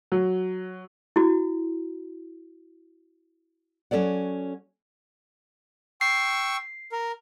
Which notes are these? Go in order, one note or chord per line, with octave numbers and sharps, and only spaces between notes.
F#3
E4 F#4
F#3 C#4 A4 D5 F#5
G5 C#6 E6 C7
A#4